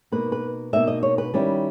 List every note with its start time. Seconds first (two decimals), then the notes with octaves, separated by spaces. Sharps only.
0.12 B2 A#3 D#4 B4
0.32 B4
0.73 B2 A#3 D#4 E5
0.87 D#5
1.03 C#5
1.18 B4
1.34 D#3 G3 C#4 E4